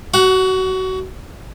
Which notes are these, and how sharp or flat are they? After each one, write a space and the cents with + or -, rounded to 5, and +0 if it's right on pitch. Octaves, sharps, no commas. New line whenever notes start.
F#4 +25 F#5 +0